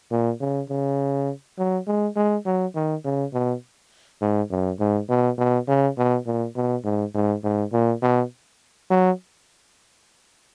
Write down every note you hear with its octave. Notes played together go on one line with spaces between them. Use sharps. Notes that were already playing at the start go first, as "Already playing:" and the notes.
A#2
C#3
C#3
F#3
G#3
G#3
F#3
D#3
C#3
B2
G#2
F#2
G#2
B2
B2
C#3
B2
A#2
B2
G#2
G#2
G#2
A#2
B2
F#3